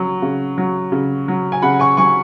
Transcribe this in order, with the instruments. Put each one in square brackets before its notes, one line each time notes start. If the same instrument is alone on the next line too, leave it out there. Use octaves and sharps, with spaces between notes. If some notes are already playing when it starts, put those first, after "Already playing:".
Already playing: [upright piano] C#3 F#3
C#3
F#3
C#3
F#3
G#5
C#3 F#5 B5
G#5 C#6
F#3 G#5 C#6